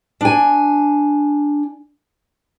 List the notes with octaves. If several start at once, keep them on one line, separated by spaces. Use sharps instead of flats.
D4 G#5